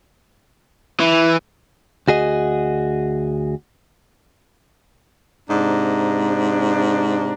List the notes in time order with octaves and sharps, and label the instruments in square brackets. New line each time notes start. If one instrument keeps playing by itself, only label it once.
[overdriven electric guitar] E3
[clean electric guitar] D2 F#4 G#4 D#5
[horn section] G#2 C3 D4 A#5